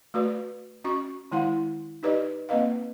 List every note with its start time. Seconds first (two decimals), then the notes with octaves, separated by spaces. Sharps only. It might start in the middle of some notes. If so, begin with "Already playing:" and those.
0.14 A3 F#4 B4 D5
0.84 C#4 F#4 C#6
1.32 D#3 G#3 E4 F5 F#5
2.03 D#4 G4 B4 D5 D#5
2.49 A#3 C4 B4 D#5 F5